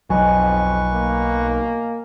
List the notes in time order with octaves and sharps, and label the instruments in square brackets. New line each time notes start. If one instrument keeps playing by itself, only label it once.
[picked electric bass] B1 F#3 [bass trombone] F2 [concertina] B4 C#6 [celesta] D#5 G#5
[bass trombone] A#3